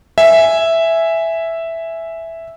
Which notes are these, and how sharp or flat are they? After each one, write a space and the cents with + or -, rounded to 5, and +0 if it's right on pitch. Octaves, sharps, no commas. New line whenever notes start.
E5 +0 G#5 +0